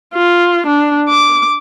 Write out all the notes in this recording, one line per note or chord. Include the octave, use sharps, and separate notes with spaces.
F4
D4
D6